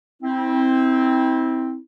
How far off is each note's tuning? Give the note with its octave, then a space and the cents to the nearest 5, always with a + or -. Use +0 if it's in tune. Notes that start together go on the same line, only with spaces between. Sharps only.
C4 +0 E4 -35